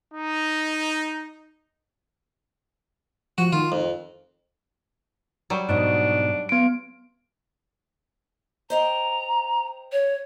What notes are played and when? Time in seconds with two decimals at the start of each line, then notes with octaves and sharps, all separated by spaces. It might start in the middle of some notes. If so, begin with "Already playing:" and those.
0.14 D#4
3.38 F3 F#4
3.53 D#3 F4
3.72 F2
5.50 F#3 G3
5.69 G#2 B2 D4 D#4
6.49 B3 D7
8.70 C5 D#5 G5 A#5
9.92 C#5